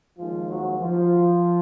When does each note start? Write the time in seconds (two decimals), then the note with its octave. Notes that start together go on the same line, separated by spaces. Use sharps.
0.18 D#2 D#3 F3 G#3 F4
0.49 F#3 F#4
0.79 F3 F4